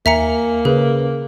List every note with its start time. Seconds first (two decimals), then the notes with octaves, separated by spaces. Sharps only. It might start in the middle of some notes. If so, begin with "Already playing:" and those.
0.06 D#2 A#3 E5 G#5 A#5 C#7
0.65 C#3 G#4 B4